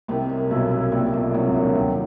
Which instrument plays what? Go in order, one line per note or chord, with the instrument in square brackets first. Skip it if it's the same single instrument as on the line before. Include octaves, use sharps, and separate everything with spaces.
[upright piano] C2 C3 [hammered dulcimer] D#3
[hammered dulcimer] F#2
[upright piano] B1 B2 [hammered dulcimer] E4
[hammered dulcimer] E4
[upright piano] A#1 A#2 [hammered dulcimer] G3
[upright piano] B1 B2 [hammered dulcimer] F#2
[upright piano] C2 C3 [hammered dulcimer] F#3
[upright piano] C#2 C#3
[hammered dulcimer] F#2
[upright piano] D2 D3
[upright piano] D#2 D#3 [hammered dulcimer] G3